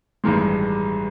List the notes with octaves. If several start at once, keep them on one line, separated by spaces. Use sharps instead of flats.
A1 G2 D#3 G#3